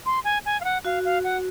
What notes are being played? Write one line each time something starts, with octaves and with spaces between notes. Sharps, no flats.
C6
G#5
G#5
F5
F#5
F#4 F5
F5
F#5